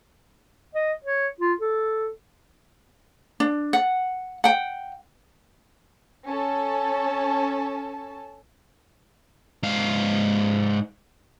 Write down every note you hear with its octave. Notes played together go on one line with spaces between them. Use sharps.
D#5
C#5
F4
A4
D4
F#5
F#5 G5
C#4 A4 A5
G#2 F5